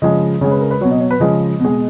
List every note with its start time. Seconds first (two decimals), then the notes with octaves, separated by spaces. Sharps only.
0.02 C#3 F3 G#3 D#5
0.41 C#3 G#3 C#5
0.51 B4
0.61 A#4
0.71 B4
0.81 B2 F#3 C#5
0.91 D#5
1.00 C#5
1.11 B4
1.20 C#3 F3 G#3 D#5
1.60 B2 G#3